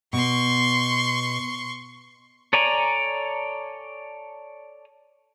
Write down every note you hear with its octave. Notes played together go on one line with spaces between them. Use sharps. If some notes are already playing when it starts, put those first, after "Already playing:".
B2 C6 C#6
A4 C#5 D5 G#5 A#5